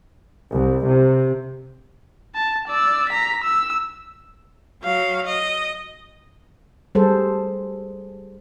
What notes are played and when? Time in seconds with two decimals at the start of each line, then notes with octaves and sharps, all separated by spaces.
0.52 C2
0.86 C3
2.35 A5
2.68 D5 E6
3.09 A#5 B6
3.44 E6
4.83 F#3 F5
5.26 D#5
6.95 G3 G#4 A4 C5